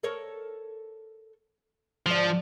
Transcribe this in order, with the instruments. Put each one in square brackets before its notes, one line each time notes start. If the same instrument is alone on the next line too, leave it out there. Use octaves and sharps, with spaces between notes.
[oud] A4 A#4 C#5
[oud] G#2 D3 D5 [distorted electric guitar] F3